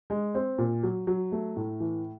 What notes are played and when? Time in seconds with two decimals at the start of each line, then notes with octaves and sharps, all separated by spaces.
0.10 G#3
0.35 C4
0.58 A#2
0.83 F#3
1.07 F#3
1.32 A3
1.56 A2
1.80 E3